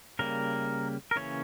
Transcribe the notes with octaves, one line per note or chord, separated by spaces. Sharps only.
C#3 G3 A#3 A#4
A#4
C#3 E3 A#3 C#4 C#5